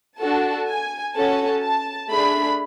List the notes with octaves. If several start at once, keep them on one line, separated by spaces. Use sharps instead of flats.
D4 F#4 A4 A5
G#5
C#4 F#4 A4 A5
A5
A3 D4 G#4 B5